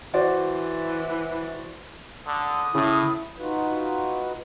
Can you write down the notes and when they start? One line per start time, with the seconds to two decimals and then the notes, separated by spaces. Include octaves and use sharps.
0.14 E3 F#4 C5 D5
2.27 D3 D#6
2.75 A2 C#3 E4
3.38 D#4 F4 F#4 B4